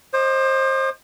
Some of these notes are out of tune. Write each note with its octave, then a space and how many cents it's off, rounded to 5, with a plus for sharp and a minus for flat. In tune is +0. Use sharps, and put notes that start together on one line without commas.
C5 +25 D#5 +0 D6 +45